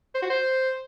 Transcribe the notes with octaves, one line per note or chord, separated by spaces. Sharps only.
C5
F#4
C5